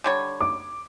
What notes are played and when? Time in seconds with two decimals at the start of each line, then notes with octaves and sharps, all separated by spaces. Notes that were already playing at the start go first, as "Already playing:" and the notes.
0.04 D3 G3 C#5
0.40 D6